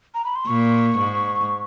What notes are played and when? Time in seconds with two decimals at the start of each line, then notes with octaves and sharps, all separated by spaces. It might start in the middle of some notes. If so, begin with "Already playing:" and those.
0.15 A#5
0.25 B5
0.36 C6
0.47 A#2 C#6
0.98 G#2